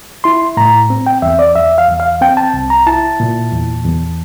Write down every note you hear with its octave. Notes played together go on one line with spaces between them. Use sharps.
E4 C6
A2 A#5
C4
G5
E2 E5
D5
E2 E5
F5
E2
F5
C4 G5
A5
C2
A#5
E4 A5
A#2
E2
E2